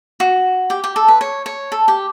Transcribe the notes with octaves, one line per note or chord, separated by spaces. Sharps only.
F#4
G4
G4
A4
B4
C#5
C#5
A4
G4